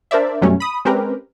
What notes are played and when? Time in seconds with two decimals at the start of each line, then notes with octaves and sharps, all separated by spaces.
0.11 D4 A#4 C5 D5 E5
0.41 F#2 B2 F#3 G3 A3 C#4
0.60 B5 D#6
0.85 G#3 C4 C#4 G4 A#4 B4